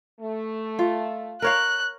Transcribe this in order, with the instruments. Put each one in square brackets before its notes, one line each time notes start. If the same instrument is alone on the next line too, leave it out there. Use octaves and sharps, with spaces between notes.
[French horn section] A3
[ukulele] F4
[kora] A#4 C#5 F5 [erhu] F#6